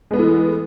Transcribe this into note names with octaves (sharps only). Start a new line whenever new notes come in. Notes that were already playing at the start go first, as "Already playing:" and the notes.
E3 G#3 A3 B3